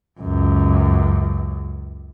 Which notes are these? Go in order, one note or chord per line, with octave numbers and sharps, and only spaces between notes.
C#2 F#2